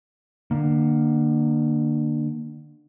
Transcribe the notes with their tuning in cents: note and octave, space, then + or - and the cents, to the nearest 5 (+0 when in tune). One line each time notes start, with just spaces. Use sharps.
D3 +30 A#3 +0